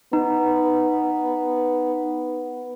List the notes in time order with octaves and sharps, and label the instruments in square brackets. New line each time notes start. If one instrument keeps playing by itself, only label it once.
[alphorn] B3 [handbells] D#4